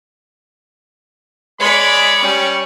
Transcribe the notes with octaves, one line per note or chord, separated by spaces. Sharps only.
G#3 C#5 D5 B5
G3 C#4